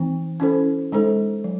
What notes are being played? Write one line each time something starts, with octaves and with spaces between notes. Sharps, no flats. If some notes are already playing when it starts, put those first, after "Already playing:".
Already playing: E3 C4 D#4
C#4 E4 A4 C5
G#3 D#4 A4 C5
F#3